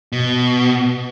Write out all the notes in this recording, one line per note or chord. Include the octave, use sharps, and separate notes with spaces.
B2